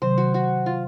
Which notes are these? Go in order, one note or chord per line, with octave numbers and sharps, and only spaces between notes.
C3 D#3 F#3 C5
F#4
F#4
F4